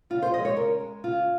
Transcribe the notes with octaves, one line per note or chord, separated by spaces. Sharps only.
C#3 F4
C5
F3 G#3 D#5
C#5
C#3 A#4
G#3
C#3 F4